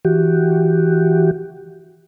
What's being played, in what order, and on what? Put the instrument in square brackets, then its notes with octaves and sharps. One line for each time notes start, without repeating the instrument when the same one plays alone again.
[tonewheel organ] E3 F#4 G4